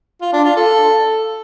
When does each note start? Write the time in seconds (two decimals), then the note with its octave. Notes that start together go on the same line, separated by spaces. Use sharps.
0.22 F4
0.33 D4
0.45 F4
0.57 A4